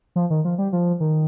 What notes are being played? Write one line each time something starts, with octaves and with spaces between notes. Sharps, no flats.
F3
D#3
F3
G3
F3
D#3